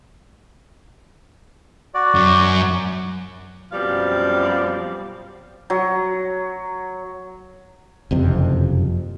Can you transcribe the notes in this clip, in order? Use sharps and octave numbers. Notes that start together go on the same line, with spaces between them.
F#4 D5
F#2
F#2 B2 F3 G3 C4 F5
F#3
F#1 F2 C3